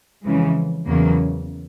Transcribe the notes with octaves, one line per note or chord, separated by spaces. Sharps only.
F2 C#3 E3 G#3
E2 C#3 F#3 A#3